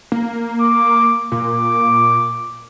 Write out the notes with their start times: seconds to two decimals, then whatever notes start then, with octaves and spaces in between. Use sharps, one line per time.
0.12 A#3
0.61 D6
1.32 A#2 D6